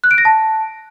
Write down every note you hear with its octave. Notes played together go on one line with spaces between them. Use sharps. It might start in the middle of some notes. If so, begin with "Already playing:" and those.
F#6
D7
A#6
A5